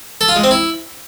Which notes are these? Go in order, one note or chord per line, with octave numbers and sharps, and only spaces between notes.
A4
F4
G#3
C4
E4